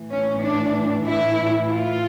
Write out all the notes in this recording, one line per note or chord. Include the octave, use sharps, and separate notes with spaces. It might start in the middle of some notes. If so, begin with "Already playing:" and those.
Already playing: A2 E3
C#4
D4
E4
F4